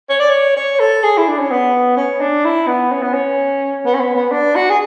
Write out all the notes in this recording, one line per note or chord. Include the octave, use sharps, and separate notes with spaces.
C#5
D5
C#5
C#5
A4
G#4
E4
D4
C#4
B3
C#4
D4
E4
B3
C#4
B3
C#4
B3
C#4
B3
B3
D4
F#4
G#4